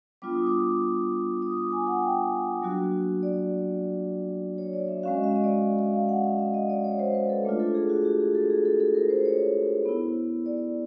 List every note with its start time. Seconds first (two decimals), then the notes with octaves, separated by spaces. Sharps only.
0.22 G3 B3 D4 F4 D6
0.34 D#6
0.47 D6
1.42 D#6
1.57 D6
1.72 G#5
1.87 F#5
2.02 G5
2.62 F#3 A#3 D4 F#4
3.23 D5
4.58 C#5
4.73 D5
4.88 E5
5.03 G#3 C#4 F#4 F5
5.15 D#5
5.24 E5
5.36 D#5
5.44 D5
5.79 E5
5.94 F5
6.09 F#5
6.24 E5
6.39 E5
6.54 D#5
6.69 D5
6.84 C#5
6.99 C5
7.14 B4
7.30 A4
7.45 A3 D4 F4
7.60 A4
7.75 G#4
7.90 F#4
8.05 G4
8.20 G#4
8.35 A4
8.50 G#4
8.65 A4
8.80 A4
8.94 A#4
9.10 C5
9.25 C#5
9.85 B3 E4
10.46 D5